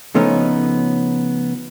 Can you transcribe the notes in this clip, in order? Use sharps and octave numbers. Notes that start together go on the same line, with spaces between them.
C#3 F3 A3 B3 C#4 D#4